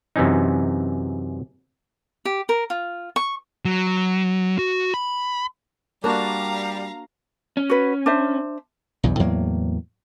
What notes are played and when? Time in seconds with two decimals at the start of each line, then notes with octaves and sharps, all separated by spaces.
0.16 F#2 C3 E3 C#4 D#4
2.25 G4
2.49 A#4
2.70 F4
3.16 C#6
3.65 F#3
4.59 F#4
4.94 B5
6.04 G3 A#3 D4 F#4 F5 A#5
7.57 C#4
7.69 F#4 B4
8.06 D4 C5 E5
9.03 B1 E2 G2
9.19 E2 A2 F#3 A#3